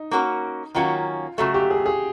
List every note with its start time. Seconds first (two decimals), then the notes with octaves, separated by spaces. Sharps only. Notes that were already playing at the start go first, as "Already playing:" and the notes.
Already playing: D#4
0.11 A#3 C#4 F#4 A#4
0.75 D#3 F#3 A#3 C#4 F4 F#4
1.38 C#3 F#3 A3 F#4
1.54 G4
1.70 G#4
1.86 G#4